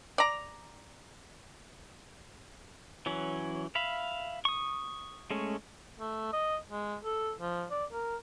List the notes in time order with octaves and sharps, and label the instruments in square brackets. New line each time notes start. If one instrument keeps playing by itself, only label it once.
[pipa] D5 A#5
[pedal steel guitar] E3 F#3 C#4
E5 F5 B5
C#6 D#6
G#3 A3 C#4
[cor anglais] A3
D#5
G#3
A4
F3
D5
A#4